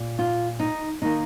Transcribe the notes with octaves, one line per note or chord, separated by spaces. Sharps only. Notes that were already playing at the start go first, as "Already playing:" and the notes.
Already playing: A#2
F4
D#4
D#3 A#3 D#4